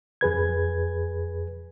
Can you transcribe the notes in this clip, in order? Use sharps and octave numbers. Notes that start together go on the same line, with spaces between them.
F2 G#4 B4 G#6